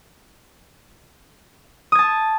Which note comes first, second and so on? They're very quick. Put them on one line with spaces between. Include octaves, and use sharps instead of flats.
D#6 G#6 A5